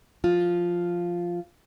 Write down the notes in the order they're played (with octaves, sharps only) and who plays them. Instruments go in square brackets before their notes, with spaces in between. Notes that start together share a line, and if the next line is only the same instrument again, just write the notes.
[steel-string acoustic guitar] F3 F4